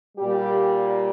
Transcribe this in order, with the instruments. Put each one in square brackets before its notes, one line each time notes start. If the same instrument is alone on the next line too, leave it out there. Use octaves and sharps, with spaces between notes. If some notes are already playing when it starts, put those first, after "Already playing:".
[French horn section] A#2 G3 G4